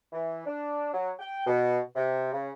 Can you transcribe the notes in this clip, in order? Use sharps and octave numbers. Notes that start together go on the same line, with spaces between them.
E3
D4
F#3
G5
B2
C3
C#3